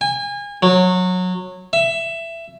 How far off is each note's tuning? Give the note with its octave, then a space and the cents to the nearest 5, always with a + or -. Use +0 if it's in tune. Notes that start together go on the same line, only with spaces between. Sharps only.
G#5 -30
F#3 -20
E5 +15